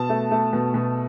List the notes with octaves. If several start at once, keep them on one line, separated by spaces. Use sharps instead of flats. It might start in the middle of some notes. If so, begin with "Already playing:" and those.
Already playing: B2 A5
A3
A3
B2
B2